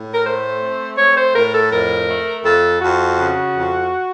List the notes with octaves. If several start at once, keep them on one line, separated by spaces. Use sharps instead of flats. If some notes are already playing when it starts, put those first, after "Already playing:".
Already playing: A2
A#4
A3 C5
C4
A3 C#5
C5
A2 A#4
A4
F2 A#4
A3
F2 A4
F2 F#4
C#3
F2